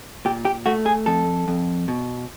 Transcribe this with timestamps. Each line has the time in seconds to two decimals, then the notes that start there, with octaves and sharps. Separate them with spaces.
0.25 A#2 G4
0.45 G4
0.66 A3 F#4
0.86 G#4
1.06 F2 A4
1.48 F2
1.88 B2